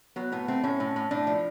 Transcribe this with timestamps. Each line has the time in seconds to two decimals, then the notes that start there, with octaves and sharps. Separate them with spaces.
0.16 F#3 B3
0.32 A2 B3
0.48 A3 C4
0.64 A2 C#4
0.80 A2
0.96 A2
1.11 A2 D4
1.27 F3